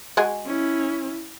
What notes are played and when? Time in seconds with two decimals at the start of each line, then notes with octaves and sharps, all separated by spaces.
0.17 G#3 F#4 G#4
0.46 C#4 E4